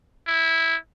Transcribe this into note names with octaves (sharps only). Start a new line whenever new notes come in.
E4